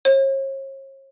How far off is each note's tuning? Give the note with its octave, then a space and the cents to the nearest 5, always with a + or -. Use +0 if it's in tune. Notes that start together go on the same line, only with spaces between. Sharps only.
C#5 -40